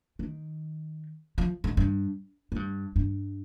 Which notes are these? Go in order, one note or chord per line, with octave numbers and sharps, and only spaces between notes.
D#3
F3
G#2
G2
G#2
G2
G2